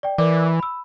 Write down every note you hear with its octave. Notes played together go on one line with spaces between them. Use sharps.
D5 G5
E3 A#4 D5 D6
B5 E6